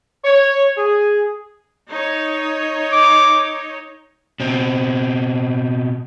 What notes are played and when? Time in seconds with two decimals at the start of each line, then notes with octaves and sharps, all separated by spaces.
0.25 C#5
0.77 G#4
1.88 D#4 C#5
2.93 D6
4.40 B2 C4